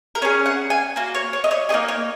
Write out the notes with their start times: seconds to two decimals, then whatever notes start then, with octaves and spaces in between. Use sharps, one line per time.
0.15 A#4
0.22 C#4 C#5
0.25 G#4
0.46 F#5
0.70 G#5
0.96 A#3 F#4
1.15 C#5
1.33 C#5
1.44 D#5
1.51 C#5
1.69 A#3 D#4 G#4 D#5
1.88 C#5